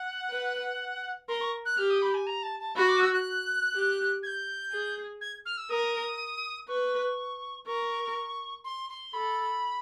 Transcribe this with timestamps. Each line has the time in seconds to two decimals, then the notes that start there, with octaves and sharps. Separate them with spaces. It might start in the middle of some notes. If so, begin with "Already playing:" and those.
Already playing: F#5
0.30 B4
1.28 A#4 C6
1.41 C#6
1.65 F#6
1.77 G4 F6
1.90 D#6
2.02 B5
2.14 G#5
2.26 A#5
2.43 A5
2.60 A5
2.76 F#4 B5
2.88 D6
3.00 E6
3.12 F#6
3.74 G4
4.23 G#6
4.26 G6
4.71 G#4
5.21 G#6
5.45 F6
5.57 E6
5.70 A#4 D#6
6.68 B4 C#6
7.66 A#4 C#6
8.64 C6
8.90 C6
9.13 A4 B5